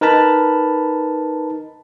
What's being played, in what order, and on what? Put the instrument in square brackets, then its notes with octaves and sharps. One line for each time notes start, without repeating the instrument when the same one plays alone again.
[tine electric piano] D#4 A#4 B4 A5 B5